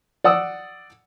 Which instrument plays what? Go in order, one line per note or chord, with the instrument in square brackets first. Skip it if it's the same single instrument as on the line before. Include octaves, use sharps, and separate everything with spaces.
[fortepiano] D5 F#5 D#6 E6